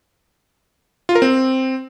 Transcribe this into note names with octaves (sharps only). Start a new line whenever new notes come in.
F4
A#4
C4